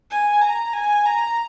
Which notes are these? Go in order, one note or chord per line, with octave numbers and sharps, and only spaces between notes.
G#5
A#5
G#5
A#5